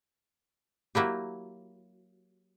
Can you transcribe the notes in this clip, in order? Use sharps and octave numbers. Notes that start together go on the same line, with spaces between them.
F#3 A#3 E4 G4